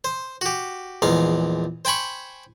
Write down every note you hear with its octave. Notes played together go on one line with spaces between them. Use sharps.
C5
F#4 G4
A#1 E2 G#3 F5
C5 G5 G#5 B5 C#6